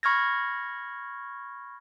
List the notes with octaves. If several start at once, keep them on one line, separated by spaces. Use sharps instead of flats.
B5 C#6 F6 G#6 A#6